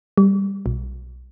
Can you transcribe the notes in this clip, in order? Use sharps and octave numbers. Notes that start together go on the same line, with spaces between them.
G3
B1